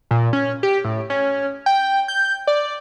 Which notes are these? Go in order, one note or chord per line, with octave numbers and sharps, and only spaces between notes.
A#2
C#4
G4
A2
C#4
G5
G6
D5